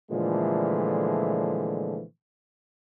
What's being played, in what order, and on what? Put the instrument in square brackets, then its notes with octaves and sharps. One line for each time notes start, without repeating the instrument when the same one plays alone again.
[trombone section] A#2 D3 E3 F3 G#3 A3